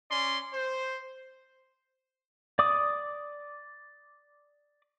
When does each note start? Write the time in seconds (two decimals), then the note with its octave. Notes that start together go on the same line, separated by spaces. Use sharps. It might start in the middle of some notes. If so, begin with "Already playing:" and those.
0.10 C#4 D5 C6
0.54 C5
2.59 D5 D6 D#6